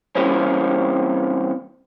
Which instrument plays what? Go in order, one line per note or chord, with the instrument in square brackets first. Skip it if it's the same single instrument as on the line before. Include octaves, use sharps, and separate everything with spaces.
[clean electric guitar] C3 E3 G3 A#3 C4 C#4